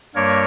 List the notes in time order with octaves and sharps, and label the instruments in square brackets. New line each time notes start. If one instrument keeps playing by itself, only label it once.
[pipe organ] G2 G3 A#3 A#4 C#5